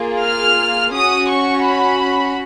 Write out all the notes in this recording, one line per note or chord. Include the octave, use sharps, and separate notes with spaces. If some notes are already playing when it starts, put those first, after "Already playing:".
Already playing: A#3 F4 G#4
F6
C#4 F#4 D#6
C#6
B5